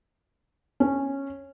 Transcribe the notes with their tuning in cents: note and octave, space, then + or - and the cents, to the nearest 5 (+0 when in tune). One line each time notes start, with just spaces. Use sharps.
C#4 -10